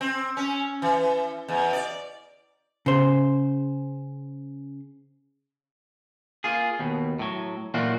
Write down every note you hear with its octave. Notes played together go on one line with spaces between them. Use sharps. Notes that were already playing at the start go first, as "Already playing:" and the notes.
C4
C#4
E3
E2
D5
C#3 C5
A#3 F4 G#4
D#2 B2
A2 F#3
A#2 E3 F#3 A3 F4 F#4